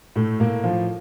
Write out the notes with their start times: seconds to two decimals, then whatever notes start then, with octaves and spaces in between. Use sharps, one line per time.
0.16 A2 A3
0.40 A2 A#3
0.64 F3 F4